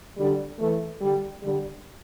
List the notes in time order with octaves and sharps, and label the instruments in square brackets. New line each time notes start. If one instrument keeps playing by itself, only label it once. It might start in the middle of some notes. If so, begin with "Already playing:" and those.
[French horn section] D3 G3
E3 A3
D3 G3
D3 G3